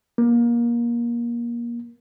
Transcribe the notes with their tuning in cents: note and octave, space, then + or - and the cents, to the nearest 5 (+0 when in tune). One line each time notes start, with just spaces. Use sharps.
A#3 +25